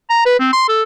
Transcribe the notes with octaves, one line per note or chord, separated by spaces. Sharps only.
A#5
B4
C4
C6
A4